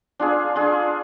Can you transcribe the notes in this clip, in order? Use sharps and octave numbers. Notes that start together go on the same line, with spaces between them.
D4 F4 G#4
D4 F4 G#4